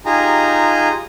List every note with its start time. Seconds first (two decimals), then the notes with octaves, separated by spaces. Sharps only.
0.06 D#4 F4 G4 G#4 G#5 A#5